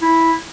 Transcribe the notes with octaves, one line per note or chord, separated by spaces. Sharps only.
E4